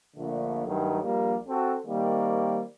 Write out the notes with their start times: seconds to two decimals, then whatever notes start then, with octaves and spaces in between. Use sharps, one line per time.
0.16 A#1 A#2 D3 A3
0.66 G2 D#3 F#3 A3
1.02 A#1 G3 A#3
1.48 C4 F#4 A4
1.86 D#3 G3 A#3 C4